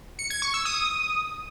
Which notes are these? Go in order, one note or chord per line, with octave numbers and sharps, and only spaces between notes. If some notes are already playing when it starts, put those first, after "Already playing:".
C#7
G#6
C#6
E6
D#6